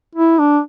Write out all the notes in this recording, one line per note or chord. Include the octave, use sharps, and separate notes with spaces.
E4
D4